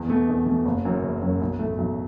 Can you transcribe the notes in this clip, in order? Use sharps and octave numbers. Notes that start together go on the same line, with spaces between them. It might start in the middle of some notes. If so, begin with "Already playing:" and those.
Already playing: E2
B2 A3
E2
B2
A3
F#1
F#2 F#3 C#4
F#1
F#2 F#3 C#4
B1
A2 A3
B1